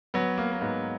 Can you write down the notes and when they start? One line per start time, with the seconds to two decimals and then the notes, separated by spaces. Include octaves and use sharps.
0.14 F#3 B3
0.38 A#3
0.51 A#3
0.61 G#2 B3